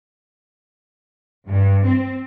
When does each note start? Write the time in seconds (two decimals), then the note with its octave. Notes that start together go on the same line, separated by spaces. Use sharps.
1.48 G2
1.85 C4